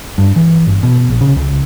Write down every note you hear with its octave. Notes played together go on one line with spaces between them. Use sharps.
G2
E3
G1
B2
A#1
C#3
C#2